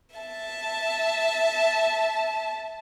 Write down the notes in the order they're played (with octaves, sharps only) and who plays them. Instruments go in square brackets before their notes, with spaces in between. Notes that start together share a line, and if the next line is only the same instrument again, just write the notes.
[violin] E5 A5